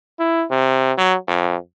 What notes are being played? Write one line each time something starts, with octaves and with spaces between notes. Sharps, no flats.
E4
C3
F#3
F2